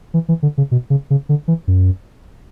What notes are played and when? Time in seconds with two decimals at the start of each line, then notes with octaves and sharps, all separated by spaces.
0.14 E3
0.29 E3
0.43 D3
0.58 C#3
0.71 B2
0.90 C#3
1.10 C#3
1.29 D3
1.48 E3
1.68 F#2